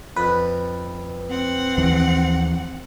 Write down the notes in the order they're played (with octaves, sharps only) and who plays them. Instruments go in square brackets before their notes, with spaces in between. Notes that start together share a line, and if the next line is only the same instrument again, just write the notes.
[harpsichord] F2 [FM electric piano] B4
[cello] C4 F#5
[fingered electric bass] D#2 E3 F3